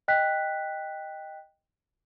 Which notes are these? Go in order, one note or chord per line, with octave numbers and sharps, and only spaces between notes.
D#5 G5 F#6 B6